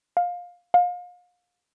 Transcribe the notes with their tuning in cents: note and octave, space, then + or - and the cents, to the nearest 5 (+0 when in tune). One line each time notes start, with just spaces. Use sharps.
F5 +20
F5 +35